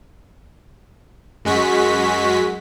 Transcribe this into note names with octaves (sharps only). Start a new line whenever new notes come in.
F#2 G#3 F#4 B6